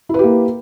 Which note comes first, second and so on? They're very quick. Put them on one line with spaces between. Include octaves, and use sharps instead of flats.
E4 B4 G4 A#3